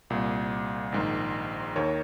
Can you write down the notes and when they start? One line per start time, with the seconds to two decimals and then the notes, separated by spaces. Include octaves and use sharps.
0.10 C2 A#2
0.92 A#1 G#2 D#3
1.76 D#2 D#3 A#4 C#5